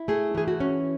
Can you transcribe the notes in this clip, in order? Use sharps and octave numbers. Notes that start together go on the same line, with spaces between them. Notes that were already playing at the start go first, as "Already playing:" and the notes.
Already playing: E4
A3 G#4
E3 G#4
F#4
C#4